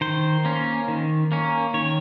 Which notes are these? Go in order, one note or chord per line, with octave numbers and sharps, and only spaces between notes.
D#3 C5
A#3 C#4
D#3
A#3 C#4
D#3 C#5